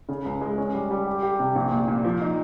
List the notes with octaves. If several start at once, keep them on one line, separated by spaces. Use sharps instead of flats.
C#3
C#2
G#3
C#4
G3
G3
G4
G4
C3
A#1
A#2
A#2
F3
D#4